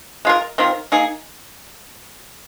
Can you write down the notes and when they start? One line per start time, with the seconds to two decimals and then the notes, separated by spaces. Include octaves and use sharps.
0.25 G#3 F4 A#4
0.58 D#3 C4 F4 A#4
0.92 A#3 D#4 G#4